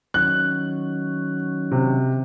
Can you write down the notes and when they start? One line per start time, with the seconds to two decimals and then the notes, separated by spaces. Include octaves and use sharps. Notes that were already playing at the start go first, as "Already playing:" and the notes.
0.14 D#3 F#3 C#4 F#6
1.71 C3